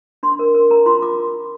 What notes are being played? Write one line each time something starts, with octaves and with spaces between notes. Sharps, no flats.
D4 C6
A#4
A#4
A#4 A#5
F4 C6
F4 D6